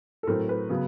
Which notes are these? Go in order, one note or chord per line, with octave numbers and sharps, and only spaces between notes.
A4
A2 F#3 A3 C4 A#4
B4
C#3 F#3 B3